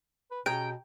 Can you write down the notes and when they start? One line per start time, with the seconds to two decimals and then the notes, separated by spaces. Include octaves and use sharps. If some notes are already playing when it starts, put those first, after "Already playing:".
0.31 B4
0.46 B2 C#4 G#4 G5 A#5